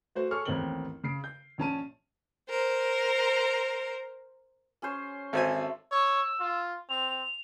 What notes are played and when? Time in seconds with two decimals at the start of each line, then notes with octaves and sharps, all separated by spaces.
0.15 A3 F#4 C5
0.31 G#4 A4 C#5 C#6 F6
0.45 A1 D#2 C4 A#4 F#7 G7
1.04 C#3 C7 D7
1.24 G6
1.58 A#1 C#4 A5 D#7
2.49 A#4 C5
4.82 C#4 G#4 C5
5.33 G#1 F#4 A4 C5 E5 G#5
5.91 C#5 E6
6.40 F4
6.89 C4 F7